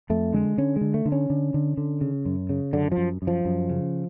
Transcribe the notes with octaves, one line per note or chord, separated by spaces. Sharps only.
F2 A3
D3 G#3
D3 C#4
D3 G#3
A3
D3
C#4
D3
D3
D3
C#3
F#2
C#3
F#2 D3
F3
F#2
F#2
F3
F#2
C#3